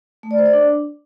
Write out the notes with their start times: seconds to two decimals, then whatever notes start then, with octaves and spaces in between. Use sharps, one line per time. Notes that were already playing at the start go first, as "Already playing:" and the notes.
0.23 A3
0.31 D5
0.38 C5
0.46 D5
0.53 D4